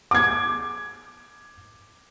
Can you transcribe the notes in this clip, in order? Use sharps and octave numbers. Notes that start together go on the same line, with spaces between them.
D6 G#6